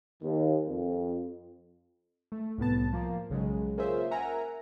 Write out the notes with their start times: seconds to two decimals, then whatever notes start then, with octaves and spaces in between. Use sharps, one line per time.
0.22 D#2
0.67 F2
2.32 A3
2.58 C2 A2 B3 A5
2.93 F3 A#3
3.30 B1 C#3 F#3 G#3
3.78 A#3 C#4 F4 G#4 C5 E5
4.11 A#4 E5 F#5 G#5 A#5